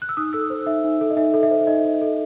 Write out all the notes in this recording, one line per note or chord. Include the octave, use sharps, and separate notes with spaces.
F#6
E6
D#4 D#6
A4 E6
C5
D#4 E5
D#4
A4
D#5
D#4 E5
A4
E5
C5
D#4 D#5
D#4
A4